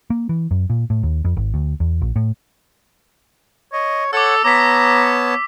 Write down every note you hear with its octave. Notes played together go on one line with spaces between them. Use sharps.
A#3
E3
F#2
A#2
A2
D#2
F2
G#1
D2
E2
A#1
A2
C#5 D#5
A4 C#5 F#5 D6 E6
B3 C#5 A5 A#5 D6 B6